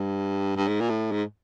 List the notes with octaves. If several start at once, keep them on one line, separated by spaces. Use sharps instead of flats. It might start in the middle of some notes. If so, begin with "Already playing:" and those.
Already playing: G2
G2
G#2
A#2
A2
G#2